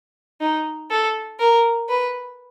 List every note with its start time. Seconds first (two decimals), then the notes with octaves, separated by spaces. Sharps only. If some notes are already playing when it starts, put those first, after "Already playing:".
0.41 D#4
0.91 A4
1.40 A#4
1.89 B4